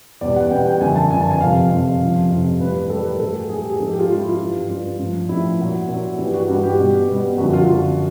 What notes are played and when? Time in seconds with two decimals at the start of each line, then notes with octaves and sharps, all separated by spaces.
0.21 E2 B2 G3 D5
0.36 F#5
0.51 E2 B2 G3 G5
0.66 G5
0.81 F#2 D3 F3 G#5
0.96 A5
1.11 F#2 D3 F3 G#5
1.21 A5
1.31 G#5
1.40 F2 C3 F3 F5
1.70 F2 C3 F3
2.00 F2 C3 F3
2.30 F2 C3 F3
2.60 A2 E3 G3 B4
2.90 A2 E3 G3 A4
3.00 B4
3.05 A#4
3.20 A2 F#3 A4
3.35 G#4
3.49 A2 F#3 G#4
3.60 G4
3.70 G#4
3.80 G#2 F3 A4
3.90 G4
3.99 F4
4.09 G#2 F3 F4
4.19 E4
4.29 F4
4.39 G2 E3 G3
4.69 G2 E3 G3 F4
4.99 A2 F3
5.29 A2 F3 E4
5.59 A#2 F#3
5.89 A#2 F#3
6.19 G2 E3 G3
6.34 F#4
6.48 G2 E3 G3
6.63 G4
6.78 B2 G3
7.08 B2 G3
7.38 F#2 D3 F3 F#4
7.53 F4
7.67 F#2 D3 F3 F4